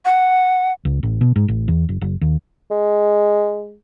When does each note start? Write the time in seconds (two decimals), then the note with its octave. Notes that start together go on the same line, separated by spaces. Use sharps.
0.05 F#5
0.85 C#2
1.03 A1
1.21 B2
1.36 G#2
1.48 A1
1.68 E2
1.89 F#1
2.01 F#1
2.21 D#2
2.71 G#3